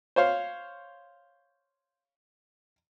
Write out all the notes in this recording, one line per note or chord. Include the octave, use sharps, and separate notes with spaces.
C5 C#5 F5